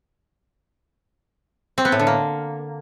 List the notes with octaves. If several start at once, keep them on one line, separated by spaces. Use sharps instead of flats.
C4
B3
A2
D3
A#3